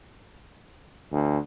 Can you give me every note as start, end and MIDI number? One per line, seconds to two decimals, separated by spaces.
1.11 1.38 38